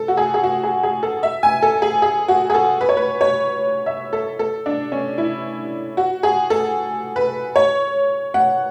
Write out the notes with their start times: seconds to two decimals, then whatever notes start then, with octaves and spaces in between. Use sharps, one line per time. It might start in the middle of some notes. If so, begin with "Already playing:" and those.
Already playing: A4
0.08 F#4
0.17 G#4
0.34 G#4
0.43 F#4
0.64 G#4
0.83 G#4
1.03 A4
1.23 E5
1.43 G#5
1.62 A4
1.82 G#4
2.02 G#4
2.28 F#4
2.50 G#4
2.54 A4
2.81 B4
2.89 C#5
2.97 B4
3.21 C#5
3.86 E5
4.13 A4
4.39 A4
4.66 D4
4.92 C#4
5.18 E4
5.97 F#4
6.23 G#4
6.50 A4
7.16 B4
7.56 C#5
8.34 F#5